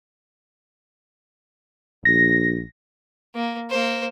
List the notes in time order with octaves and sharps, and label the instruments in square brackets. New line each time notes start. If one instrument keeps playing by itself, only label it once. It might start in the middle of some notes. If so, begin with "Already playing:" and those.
[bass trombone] A#1 [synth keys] A#6
[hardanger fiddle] A#3
A#3 C5